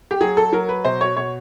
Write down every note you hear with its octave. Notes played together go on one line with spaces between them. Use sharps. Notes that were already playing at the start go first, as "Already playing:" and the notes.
G4
F#3 G#4
A4
F#3 A#4
B4
B2 C5
C#5
B2 C#5